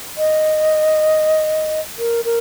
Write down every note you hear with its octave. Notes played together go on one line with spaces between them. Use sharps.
D#5
A#4
A#4